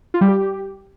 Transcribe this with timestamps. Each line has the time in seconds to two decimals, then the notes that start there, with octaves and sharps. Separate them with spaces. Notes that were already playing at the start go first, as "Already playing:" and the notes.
0.14 F4
0.21 G3
0.28 G4